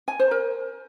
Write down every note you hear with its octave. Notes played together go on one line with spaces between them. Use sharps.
G#5
C5
A#4